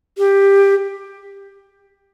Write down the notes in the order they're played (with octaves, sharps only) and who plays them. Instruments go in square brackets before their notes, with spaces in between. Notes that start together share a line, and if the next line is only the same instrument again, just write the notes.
[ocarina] G4